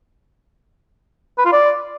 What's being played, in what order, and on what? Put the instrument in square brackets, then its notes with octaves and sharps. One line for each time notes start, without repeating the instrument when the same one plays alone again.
[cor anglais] B4
F4
D5